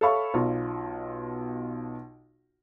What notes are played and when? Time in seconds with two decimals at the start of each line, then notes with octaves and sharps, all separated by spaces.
0.01 A4 C#5 E5 F5 B5 C#6
0.34 B1 B2 F4